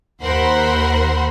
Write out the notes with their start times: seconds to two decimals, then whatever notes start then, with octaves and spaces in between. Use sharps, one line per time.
0.22 D#2 A#4 C5 F#5 B5 C6